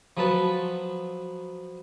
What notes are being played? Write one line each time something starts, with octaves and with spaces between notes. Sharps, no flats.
F3 F#3 B3 B4 A5